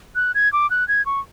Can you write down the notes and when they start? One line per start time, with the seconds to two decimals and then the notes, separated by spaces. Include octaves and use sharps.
0.15 F#6
0.35 G#6
0.53 D6
0.70 F#6
0.88 G#6
1.06 C#6